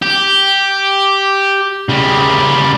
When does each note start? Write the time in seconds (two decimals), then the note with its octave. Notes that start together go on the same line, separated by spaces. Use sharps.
0.02 G4
1.89 C#3 G3